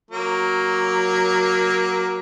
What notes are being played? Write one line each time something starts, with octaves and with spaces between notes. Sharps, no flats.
F#3 A#3